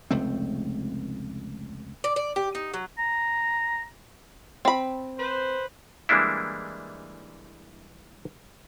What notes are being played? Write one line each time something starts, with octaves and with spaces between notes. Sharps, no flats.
F1 C#2 A3 C4
D5
D5
G4
D#4
F#3
A#5
C4 B5
B4 C5
E3 G3 G#3 A#3 D4 E4